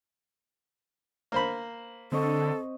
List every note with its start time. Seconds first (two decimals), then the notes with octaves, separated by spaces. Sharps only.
1.32 A#3 C5 B5
2.12 D3 C4 A4 D#5 C#6